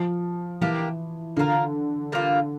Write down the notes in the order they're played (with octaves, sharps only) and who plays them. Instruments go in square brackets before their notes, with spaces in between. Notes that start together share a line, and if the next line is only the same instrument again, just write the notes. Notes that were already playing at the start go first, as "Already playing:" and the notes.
Already playing: [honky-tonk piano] F3
[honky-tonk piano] E3 [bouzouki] A#3 D4 G4
[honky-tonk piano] D3 [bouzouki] A#3 F4 A#4
[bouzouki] G3 A#3 F4 A4